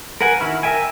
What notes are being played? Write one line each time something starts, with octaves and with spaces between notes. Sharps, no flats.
A#4 B4 F#5 G#5
D#3 E4 F#4 B5 F6
A#4 E5 G5 G#5